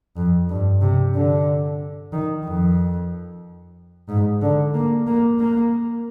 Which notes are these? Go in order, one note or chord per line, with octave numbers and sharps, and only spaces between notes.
F2
G2
C3
D3
D#3
F2
G#2
D3
A#3
A#3
A#3